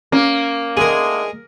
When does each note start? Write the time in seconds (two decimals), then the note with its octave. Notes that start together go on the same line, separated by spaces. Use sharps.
0.12 A#3 C#4
0.77 D2 D#3 G#3 G#4 A#4